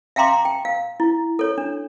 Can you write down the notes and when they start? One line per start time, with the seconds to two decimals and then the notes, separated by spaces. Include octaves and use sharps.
0.16 E5 F5 G5 A#5 C6 D6
0.45 G5
0.65 F5
1.00 E4
1.39 A4 C#5
1.58 D4